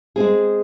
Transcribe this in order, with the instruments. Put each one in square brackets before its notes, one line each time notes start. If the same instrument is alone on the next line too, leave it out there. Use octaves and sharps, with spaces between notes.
[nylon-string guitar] G#3 C4 G#4